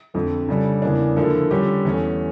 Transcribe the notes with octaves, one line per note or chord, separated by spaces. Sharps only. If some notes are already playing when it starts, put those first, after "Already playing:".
F2 D3 F3 A3
C#3 G3 D4 A4
E2 C#3 E3 A#3 D4
D3 F3 A#3 E4 A4
D3 G3 C#4 G4
E2 E3 A3 C#4